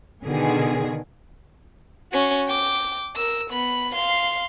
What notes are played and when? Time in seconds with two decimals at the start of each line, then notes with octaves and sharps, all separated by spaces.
0.23 B2 D3 D#3 G#4
2.12 C#4 F#4
2.47 G5 D6
3.15 A#4 E6
3.50 B3 B5
3.94 F5 C6